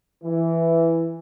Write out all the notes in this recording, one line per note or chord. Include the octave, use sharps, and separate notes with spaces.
E3